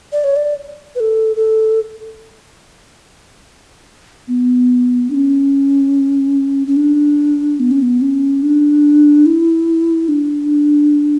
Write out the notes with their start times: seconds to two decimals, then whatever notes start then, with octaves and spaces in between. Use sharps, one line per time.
0.12 D5
0.24 C#5
0.36 D5
0.95 B4
1.00 A4
1.36 A4
4.28 B3
5.10 D4
5.15 C#4
6.67 C#4
6.76 D4
7.60 B3
7.71 C#4
7.82 B3
8.01 C#4
8.43 D4
9.26 E4
10.08 D4